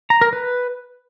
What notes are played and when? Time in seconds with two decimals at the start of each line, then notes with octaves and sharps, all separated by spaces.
0.10 A#5
0.21 A#4
0.33 B4